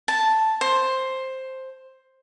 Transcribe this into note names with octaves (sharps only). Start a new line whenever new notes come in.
A5
C5